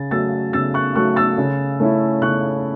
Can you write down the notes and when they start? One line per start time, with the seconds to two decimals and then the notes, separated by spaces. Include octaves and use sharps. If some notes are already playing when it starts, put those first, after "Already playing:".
Already playing: C#3 A6
0.11 F#3 A3 E6 A6
0.53 C#3 E6 A6
0.74 C#6 F#6
0.95 F#3 A3 C#6 F#6
1.16 E6 A6
1.38 C#3
1.79 A3 C#4 E4
2.22 C#3 C#6 F#6